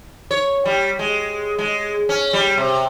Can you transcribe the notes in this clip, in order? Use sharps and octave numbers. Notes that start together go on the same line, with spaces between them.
C#5
G3
G#3
G#3
C#4
G3
C3